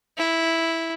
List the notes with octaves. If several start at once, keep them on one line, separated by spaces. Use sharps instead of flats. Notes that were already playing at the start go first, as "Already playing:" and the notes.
E4